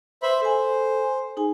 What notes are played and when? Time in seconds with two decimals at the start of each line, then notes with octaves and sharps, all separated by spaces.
0.23 B4 C5 E5 B5
0.41 A4 C5 G#5
1.37 D#4 G#4 G#5